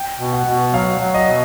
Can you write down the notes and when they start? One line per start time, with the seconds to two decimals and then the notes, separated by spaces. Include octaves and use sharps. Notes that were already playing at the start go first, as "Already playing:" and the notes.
Already playing: G5
0.20 B2
0.33 F#5
0.47 B2
0.73 F#3 F5
1.01 F#3
1.14 D#5
1.28 B2